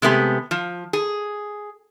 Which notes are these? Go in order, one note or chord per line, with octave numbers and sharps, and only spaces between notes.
C3 G#3 A3 B3 G4
F3
G#4